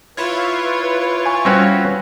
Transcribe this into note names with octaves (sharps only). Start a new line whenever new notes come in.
E4 F4 B4 C#5
G#5 C#6
G3 C4 C#4 F#4 B4